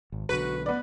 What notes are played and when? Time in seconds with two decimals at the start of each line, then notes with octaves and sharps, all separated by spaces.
0.12 G#1
0.29 B1 D3 F#4 B4
0.66 B3 B4 D5